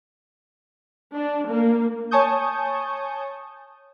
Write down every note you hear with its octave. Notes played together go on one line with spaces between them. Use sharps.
D4
A#3
C#5 G#5 A5 C#6 D#6 G6